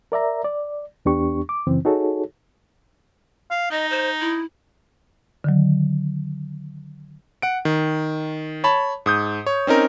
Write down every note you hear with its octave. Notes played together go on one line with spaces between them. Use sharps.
A#4 D5 E5 A#5
D5
E2 B3 D4 G4 C#6
D6
F#2 C#3 E3 C4
D#4 F#4 G#4 A4 C#5
F5
D#4 D#5
C5
E4
D3 D#3 F#3
F#5 D7
D#3
C#5 A5 B5
G#2 D#6 G6
C#5
C4 C#4 D#4 A#4